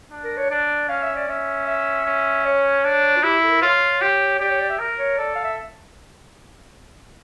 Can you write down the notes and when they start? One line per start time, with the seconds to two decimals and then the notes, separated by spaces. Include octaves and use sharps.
0.11 D4
0.24 A#4
0.37 C#5
0.50 D4 D5
0.89 C#4 F5
1.03 E5
1.16 D5
1.28 C#4 E5
1.67 E5
2.06 C#4
2.45 C#5
2.84 D4
3.17 F4
3.23 E4 G4
3.44 A4
3.49 A#4
3.62 F4 C#5
4.01 G4
4.39 G4 D5
4.50 C#5
4.60 D5
4.69 E5
4.79 A#4
4.99 C#5
5.18 A4 D5
5.35 F5
5.44 E5